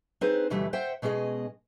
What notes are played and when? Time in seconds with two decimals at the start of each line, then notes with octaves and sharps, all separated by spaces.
0.21 C4 D#4 G#4 B4 C5
0.50 D2 B2 E3 G3 A3 E5
0.73 C5 E5 F#5 G5
1.02 B2 G#3 C#4 G#4 D#5